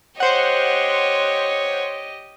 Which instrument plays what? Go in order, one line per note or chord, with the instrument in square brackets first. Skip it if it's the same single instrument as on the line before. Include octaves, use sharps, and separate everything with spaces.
[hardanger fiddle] G4 D#5 [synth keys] C5 F#5 [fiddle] C#5